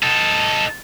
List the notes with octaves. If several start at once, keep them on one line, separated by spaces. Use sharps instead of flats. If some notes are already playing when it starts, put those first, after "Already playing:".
D#4 A4